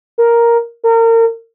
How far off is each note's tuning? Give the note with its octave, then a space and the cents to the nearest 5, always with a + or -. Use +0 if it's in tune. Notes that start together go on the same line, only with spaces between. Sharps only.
A#4 +5
A#4 -30